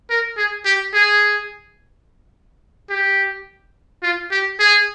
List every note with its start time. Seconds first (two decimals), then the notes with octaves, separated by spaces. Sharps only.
0.10 A#4
0.37 G#4
0.65 G4
0.94 G#4
2.90 G4
4.03 F4
4.31 G4
4.59 G#4